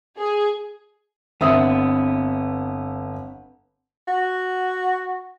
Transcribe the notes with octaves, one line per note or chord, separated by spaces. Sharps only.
G#4
G1 B3 C4 B4 E5 D#6
F#4